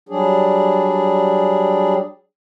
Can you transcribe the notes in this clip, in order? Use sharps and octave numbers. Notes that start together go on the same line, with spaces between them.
F#3 G3 D4 G#4